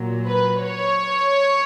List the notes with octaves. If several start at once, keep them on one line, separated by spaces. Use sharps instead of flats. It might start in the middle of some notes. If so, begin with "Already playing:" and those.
Already playing: A#2 F#3
B4
C#5